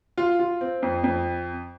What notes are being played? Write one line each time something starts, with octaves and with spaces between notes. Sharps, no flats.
F4
F4
C4
F2
F2